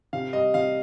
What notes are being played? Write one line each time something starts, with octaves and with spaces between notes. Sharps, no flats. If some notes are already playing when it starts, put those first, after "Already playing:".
C3 F5
G3 D#5
C3 F5